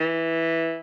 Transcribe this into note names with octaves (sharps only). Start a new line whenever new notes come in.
E3